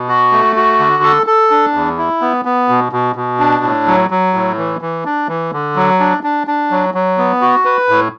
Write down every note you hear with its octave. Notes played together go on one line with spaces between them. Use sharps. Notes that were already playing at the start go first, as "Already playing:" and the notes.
Already playing: B2
F#4
A3
F#4
D3
A4
A4
D4
E2
E4
B3
B3
B2
B2
B2
D4
A2
F#3
F#3
A2
E3
E3
D4
E3
D3
F#3
D4
D4
D4
F#3
F#3
B3
F#4
B4
A2